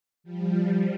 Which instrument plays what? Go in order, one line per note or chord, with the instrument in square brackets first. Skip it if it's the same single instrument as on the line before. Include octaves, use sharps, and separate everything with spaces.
[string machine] F3 G3